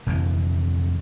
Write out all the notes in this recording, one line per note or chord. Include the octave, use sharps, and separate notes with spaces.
F1 F2 A#2 E3